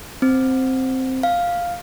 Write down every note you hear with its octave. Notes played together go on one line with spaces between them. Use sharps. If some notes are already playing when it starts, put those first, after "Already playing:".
C4
F5